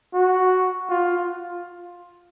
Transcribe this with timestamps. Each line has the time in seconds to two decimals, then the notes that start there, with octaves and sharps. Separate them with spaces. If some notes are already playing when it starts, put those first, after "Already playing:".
0.14 F#4
0.90 F4